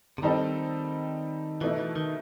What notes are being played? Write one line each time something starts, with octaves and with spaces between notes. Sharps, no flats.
C3
D#3 G3 C4 D#4 A4
B2 E3 A3 D#4
E3
D#3